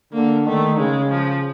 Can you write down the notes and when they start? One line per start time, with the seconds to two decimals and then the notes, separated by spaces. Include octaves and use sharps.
0.13 D3 A#3
0.46 D#3 A3
0.79 C#3 G#3
1.10 F3